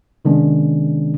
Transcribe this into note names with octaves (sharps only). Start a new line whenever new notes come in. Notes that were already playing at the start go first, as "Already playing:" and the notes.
C3 D#3 G#3 B3 C#4 D4